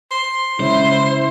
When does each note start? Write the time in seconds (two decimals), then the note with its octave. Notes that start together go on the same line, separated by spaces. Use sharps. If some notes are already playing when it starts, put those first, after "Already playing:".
0.12 C6
0.60 C#3 G#3 C#4 E4 C5